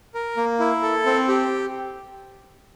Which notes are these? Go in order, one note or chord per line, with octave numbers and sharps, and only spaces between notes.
A#4
A#3
E4
A4
C4
G4